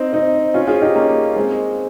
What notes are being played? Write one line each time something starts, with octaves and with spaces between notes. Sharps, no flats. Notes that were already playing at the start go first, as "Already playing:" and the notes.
Already playing: C4 D#4
C4 D#4
C#4 F4
F4 G#4
D#4 G4
A#3 C#4
G#3 C4